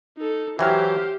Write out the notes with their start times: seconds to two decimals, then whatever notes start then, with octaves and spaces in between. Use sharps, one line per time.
0.18 D#4 A4
0.59 E3 F#3 G4 C5 E5 G5 F6